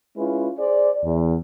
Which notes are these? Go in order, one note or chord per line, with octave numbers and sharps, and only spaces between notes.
G#3 C#4 E4 F4 B4
G#4 C5 D5
E2